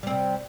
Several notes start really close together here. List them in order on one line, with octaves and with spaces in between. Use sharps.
G3 C4 C3